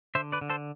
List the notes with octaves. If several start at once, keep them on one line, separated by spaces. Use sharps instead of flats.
D3 C5 E5
B4 D5
D3
A4 C5